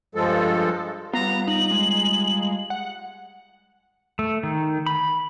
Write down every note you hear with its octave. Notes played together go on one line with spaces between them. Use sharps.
G2 F3 G#3 A4
G3 B3 F4 A#5
D#4 F#7
G#3
F#5
A3
D#3
B5